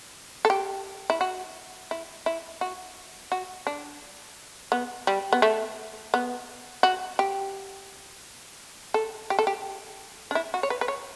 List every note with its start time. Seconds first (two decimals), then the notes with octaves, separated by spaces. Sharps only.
0.45 A4
0.50 G4
1.10 E4
1.21 F#4
1.91 E4
2.26 E4
2.61 F#4
3.32 F#4
3.67 D4
4.72 B3
5.07 G3
5.33 B3
5.42 A3
6.14 B3
6.83 F#4
7.19 G4
8.94 A4
9.30 G4
9.39 A4
9.47 G4
10.31 D4
10.35 E4
10.54 F#4
10.63 C#5
10.70 B4
10.81 B4
10.88 C#5